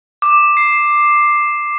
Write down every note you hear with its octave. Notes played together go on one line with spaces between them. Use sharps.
D6
C7